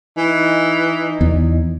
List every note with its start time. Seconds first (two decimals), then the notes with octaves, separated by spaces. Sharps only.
0.17 E3 D#4
1.21 E2